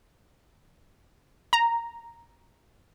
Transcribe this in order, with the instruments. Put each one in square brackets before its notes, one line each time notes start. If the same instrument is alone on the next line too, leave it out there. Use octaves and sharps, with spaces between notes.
[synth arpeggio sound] A#5